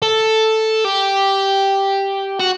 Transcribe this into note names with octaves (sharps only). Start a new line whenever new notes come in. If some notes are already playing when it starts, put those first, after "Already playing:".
A4
G4
F#4